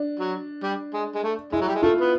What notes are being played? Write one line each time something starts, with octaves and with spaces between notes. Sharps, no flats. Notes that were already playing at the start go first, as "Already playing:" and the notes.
Already playing: D4
F#3
G3
G#3
G#3
A3
G#3 E4
F#3
G3
G#3
A3 F4
B3